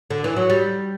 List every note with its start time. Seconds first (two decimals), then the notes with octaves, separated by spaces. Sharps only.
0.10 D3
0.24 E3
0.36 F#3
0.50 G3